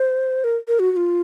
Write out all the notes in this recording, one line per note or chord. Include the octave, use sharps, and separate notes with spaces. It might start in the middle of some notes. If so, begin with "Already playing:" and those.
Already playing: C5
A#4
A#4
F#4
F#4
F4